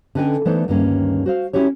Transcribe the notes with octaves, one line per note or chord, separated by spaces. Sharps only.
D3 C#4 B4 D#5 G5 G#5
E3 A3 B3 D#4 C5 D5
D2 G2 D#3 A#3 C#4
F#4 C5 F5
C#4 E4 F#4 G4 C#5